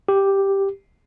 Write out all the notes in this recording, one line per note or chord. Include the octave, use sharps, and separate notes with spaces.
G4